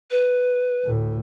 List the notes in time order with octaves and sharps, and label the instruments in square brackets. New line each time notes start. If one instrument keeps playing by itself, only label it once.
[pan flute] B4
[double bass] D2 A2